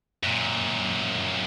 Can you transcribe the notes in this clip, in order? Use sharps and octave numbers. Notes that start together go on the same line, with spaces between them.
F#2 A#2